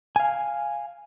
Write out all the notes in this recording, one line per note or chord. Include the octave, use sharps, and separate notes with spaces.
F5 G#5